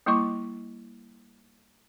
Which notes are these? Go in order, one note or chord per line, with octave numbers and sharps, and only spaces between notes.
G3 A#3 E4 D#5 C#6 D6